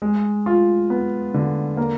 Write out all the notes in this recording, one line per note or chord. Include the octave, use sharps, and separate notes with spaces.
G#3
F4
B3
D3
A#3